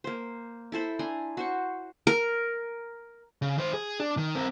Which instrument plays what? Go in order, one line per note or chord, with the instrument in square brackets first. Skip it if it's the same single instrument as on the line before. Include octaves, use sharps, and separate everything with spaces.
[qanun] A#3 C5
E4 A4 C5 B5
D4 G#5 A#5 C6
F#4 C5 C#6
A#4
[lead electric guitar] C#3
D#3 C5
G#4
D4
D#3
C4 A#4